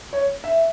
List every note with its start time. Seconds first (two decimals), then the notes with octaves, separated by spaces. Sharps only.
0.13 C#5
0.44 E5